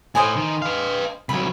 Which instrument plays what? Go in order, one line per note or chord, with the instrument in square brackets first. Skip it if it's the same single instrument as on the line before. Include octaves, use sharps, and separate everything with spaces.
[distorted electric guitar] A2 [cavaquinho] C5 D#5 G#5
[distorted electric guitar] D#3
B4 F5
[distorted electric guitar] C2 F#3 [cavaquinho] B5